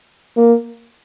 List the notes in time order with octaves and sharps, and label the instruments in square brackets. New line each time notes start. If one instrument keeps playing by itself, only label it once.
[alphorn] A#3